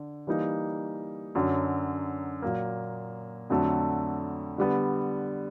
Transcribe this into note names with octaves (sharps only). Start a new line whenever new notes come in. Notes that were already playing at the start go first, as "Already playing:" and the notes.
Already playing: D3
E3 G3 A#3 D#4
F#2 D3 F#3
A#2 F#3 A#3
F2 D3 F#3 A3
D3 G3 B3